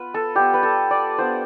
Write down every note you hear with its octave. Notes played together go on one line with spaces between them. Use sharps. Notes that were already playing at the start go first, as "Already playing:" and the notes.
Already playing: B3 F4 B4
A4
G3 B3 F4 G4
B4
A4
D5
B3 D4 F4 C5